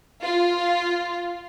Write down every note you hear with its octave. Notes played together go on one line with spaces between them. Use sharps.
F4